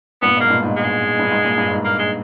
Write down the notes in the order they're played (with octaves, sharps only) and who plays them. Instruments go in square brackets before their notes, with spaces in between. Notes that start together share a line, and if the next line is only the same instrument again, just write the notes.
[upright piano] G2 A#2 [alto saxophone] B3
[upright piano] G#2 B2
[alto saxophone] A#3
[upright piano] G2 A#2
G#2
[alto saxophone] G#3
[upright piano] G2
G#2
G2 A#2
G2
G#2
[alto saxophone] A#3
G#3